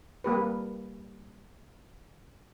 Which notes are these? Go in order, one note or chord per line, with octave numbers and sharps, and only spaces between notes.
G3 A#3 G4 B4